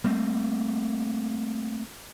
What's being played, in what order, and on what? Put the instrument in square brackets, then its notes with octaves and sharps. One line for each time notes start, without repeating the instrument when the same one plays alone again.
[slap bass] G3 A3 A#3 C4